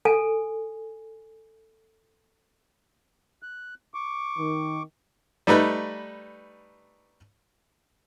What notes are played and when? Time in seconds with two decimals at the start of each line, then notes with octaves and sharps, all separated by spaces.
0.05 A4 G#5
3.43 F#6
3.94 C#6 D6
4.37 D#3
5.47 G3 A3 D#4 B4